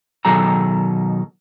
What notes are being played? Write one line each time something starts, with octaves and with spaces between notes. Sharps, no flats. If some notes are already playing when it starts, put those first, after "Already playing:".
B2 D#3 F#3 G#4 A4 A#5